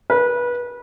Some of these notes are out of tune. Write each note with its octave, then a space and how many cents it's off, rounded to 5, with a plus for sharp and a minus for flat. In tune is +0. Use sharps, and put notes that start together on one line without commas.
B4 -25